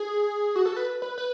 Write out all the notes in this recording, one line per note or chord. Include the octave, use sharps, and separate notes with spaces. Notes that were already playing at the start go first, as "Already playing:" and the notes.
Already playing: G#4
F#4
A4
B4
B4
B4